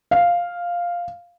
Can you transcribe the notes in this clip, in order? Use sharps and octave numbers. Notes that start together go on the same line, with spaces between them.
F5